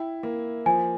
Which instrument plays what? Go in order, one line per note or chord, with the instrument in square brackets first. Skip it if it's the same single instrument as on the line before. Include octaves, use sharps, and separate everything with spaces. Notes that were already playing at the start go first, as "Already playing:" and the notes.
Already playing: [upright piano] E4 [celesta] G5
[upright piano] A#3
[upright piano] F3 [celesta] G#5